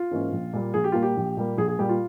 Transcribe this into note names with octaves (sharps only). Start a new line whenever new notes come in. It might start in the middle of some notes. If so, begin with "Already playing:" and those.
Already playing: F4
G#2 E3 A#3 C#4
A#1
A#2 G3 A#3
A#1 G#4
G4
A#2 G3 A#3 F4
G4
A#1
A#2 G3 A#3
A#1 G#4
G#4
A#2 G3 A#3 G4
F4